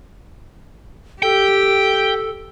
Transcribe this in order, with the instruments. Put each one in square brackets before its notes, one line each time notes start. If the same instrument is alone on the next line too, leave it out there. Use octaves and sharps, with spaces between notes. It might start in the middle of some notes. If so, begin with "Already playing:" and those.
[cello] G4 [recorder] A4 [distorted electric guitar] G5